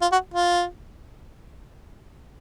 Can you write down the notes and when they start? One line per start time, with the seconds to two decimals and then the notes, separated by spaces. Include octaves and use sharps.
0.02 F4
0.12 F#4
0.34 F4